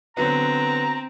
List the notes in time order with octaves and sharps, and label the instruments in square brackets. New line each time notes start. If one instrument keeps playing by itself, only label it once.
[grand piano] D3 F#3 B3 [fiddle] C4 [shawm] A#5